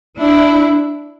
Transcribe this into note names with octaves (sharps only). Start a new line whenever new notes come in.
D4 E4